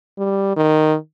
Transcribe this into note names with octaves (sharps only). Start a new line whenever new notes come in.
G3
D#3